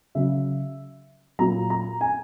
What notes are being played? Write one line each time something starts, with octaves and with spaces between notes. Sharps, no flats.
C#3 F#3 E5
A#2 F#3 A#5
A#5
G#5